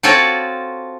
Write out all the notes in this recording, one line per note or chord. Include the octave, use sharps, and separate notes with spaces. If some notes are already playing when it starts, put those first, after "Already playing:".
C4 F4 F#4 A4 C#5 D5